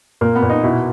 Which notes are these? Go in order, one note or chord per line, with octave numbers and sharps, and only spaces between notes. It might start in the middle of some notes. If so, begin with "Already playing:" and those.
A#2 A#3
B3
A#2
D#4
B2 E4